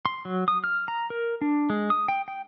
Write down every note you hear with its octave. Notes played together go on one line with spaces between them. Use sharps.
C6
F#3
D#6
F6
A#5
A#4
D4
G#3
D#6
G5
G5